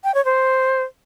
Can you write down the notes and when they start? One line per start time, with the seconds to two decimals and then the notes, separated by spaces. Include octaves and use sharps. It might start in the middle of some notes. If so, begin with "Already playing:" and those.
0.04 G5
0.15 C#5
0.25 C5